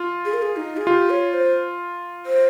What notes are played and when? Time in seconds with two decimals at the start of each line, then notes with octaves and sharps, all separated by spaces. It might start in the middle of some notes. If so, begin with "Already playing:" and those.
Already playing: F4
0.25 G#4
0.34 A#4
0.42 G#4
0.56 D#4
0.77 G#4
0.87 F4 G4
1.10 C#5
1.34 C5
2.26 C5